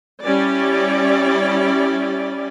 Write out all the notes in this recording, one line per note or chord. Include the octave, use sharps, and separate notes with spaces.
G3 C#4 E4 D5